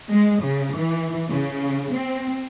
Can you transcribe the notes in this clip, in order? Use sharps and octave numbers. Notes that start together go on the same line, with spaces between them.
G#3
C#3
E3
C#3
C4